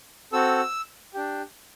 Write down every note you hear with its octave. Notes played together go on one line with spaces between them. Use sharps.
C4 F#4 A4 E6
D4 G4